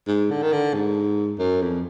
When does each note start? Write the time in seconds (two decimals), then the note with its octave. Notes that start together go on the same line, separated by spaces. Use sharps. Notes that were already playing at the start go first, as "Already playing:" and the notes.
0.08 G#2
0.31 D3
0.42 D#3
0.52 D3
0.74 G#2
1.39 F#2
1.62 F2